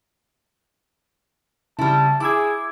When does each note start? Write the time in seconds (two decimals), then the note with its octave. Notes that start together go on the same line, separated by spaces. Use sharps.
1.79 C#3 G3 E4 A5
2.20 E4 G#4 D6 E6 G#6